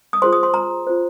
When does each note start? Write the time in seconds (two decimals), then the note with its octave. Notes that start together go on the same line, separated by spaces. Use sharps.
0.13 D#6
0.22 F4 G#4 C5 C6
0.33 D#6
0.43 C6
0.54 A#5
0.87 F4 C5